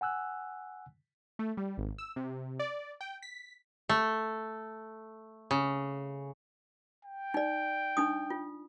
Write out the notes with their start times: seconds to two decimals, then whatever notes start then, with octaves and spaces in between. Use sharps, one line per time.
0.01 F#5 G#5 E6 F#6
1.39 A3
1.57 G3
1.78 G#1
1.98 E6
2.16 C3
2.59 D5
3.01 G5
3.22 B6
3.89 A3
5.51 C#3
7.05 G5
7.34 D#4 D5
7.97 D4 D#4 D#6
8.30 F4